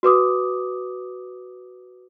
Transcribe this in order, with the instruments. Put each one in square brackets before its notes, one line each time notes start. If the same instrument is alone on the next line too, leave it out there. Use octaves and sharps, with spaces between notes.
[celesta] F#4 B4 D6 D#6